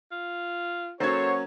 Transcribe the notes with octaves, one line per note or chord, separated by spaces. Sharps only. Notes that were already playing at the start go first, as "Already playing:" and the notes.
F4
F#3 A#3 C#4 F#4 A4 C5 C#5 G#6